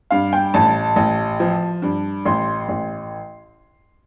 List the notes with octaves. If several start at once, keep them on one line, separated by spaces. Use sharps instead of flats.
G2 F5
G5
A1 A5
A1
F3
G2
A1 C6
A1